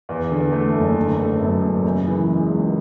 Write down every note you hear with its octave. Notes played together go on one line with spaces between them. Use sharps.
E2
D3
A3
F#1
D3
A3
F#2
F#2
C#3
E3
G#3
C#2